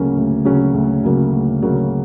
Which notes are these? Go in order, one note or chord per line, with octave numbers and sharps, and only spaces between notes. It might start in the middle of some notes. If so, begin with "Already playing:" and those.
Already playing: D2 C#3 F#3 A#3 C#4
D2
C#3 F#3 A#3 C#4
D2
C#3 F#3 A#3 C#4
D2
C#3 F#3 A#3 C#4